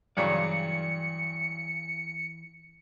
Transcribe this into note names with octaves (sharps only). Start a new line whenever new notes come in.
G2 C#3 E3 F#3 D5 C#7